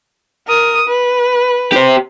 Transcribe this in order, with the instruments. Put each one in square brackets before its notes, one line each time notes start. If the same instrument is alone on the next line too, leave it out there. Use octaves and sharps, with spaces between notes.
[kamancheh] A#4 D#6
B4
[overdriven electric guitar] G4 C5